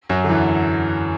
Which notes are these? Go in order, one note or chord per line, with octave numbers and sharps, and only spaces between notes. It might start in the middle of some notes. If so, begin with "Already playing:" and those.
F#2 F#3
D3
E2 E3